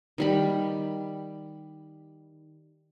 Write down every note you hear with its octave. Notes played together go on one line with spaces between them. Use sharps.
D#3 G3 B5